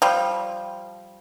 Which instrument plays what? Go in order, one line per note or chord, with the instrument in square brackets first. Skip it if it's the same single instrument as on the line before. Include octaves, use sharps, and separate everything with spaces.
[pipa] F3 G3